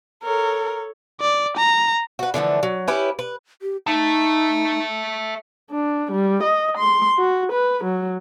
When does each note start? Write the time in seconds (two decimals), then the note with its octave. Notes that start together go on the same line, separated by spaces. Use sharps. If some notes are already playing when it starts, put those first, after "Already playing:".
0.23 A4 A#4 C#5
1.21 D5
1.57 A#5
2.19 F#4 B4
2.34 D3 E3 F3 A3
2.63 F#3
2.88 C#4 E4 G4 B4
3.19 B4
3.62 G4
3.87 D#4 E5 A5
5.71 D4
6.11 G3
6.43 D#5
6.77 C6
7.18 F#4
7.52 B4
7.84 F#3